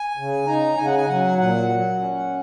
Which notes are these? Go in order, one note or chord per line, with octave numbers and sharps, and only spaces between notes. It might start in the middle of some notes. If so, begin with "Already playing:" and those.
Already playing: G#5
C#3
D#4 A#5
C#3 G#5
F#5
G#5
F#3 F#5
A#2 F#5
F#3
C#4